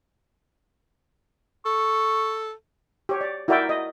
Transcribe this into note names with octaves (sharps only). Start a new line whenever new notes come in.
A4 C#6
G4 C#5
D5
E4 F#4 A#4 D5 E5 G5
D#5